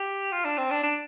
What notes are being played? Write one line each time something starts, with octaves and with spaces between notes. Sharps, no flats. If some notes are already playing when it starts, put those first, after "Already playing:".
Already playing: G4
F4
D4
C4
D4
D4